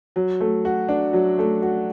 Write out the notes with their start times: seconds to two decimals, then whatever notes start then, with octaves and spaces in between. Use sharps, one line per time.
0.16 F#3
0.40 A3
0.65 F#4
0.89 D4
1.13 F#3
1.39 A3
1.62 F#4